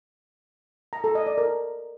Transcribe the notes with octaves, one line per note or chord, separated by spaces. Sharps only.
A#5
A4
D#5
D5
A#4